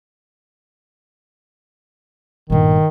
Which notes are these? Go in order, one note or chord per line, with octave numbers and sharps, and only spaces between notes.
G1 A#2 D#3